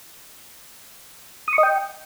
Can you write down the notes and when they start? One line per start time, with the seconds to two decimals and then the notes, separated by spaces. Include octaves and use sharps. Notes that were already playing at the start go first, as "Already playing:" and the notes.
1.48 D#6
1.53 C#6
1.58 D#5
1.63 G5